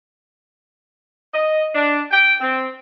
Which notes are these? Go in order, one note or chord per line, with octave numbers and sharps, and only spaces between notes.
D#5
D4
G5
C4